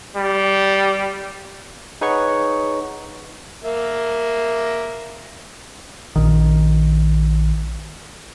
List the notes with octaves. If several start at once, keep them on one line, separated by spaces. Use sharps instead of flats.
G3
D#4 G#4 B4 C#5 F#5 C#6
A#3 E5
A#1 D#3